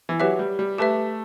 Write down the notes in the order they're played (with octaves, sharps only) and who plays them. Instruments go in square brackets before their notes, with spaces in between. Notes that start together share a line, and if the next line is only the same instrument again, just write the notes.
[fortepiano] E3
[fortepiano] F#3 [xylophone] G4 B4 E5
[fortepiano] G3
G3
[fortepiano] A3 [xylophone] G4 B4 E5